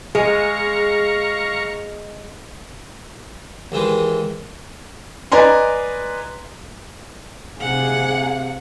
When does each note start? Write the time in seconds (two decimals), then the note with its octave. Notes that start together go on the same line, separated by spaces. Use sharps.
0.15 G#3 G#4 F5 A#5 C#6
3.72 D#2 D#3 E3 G#3
5.32 B4 D5 D#5 G#5 A#5 C6
7.60 C3 G#4 F5 F#5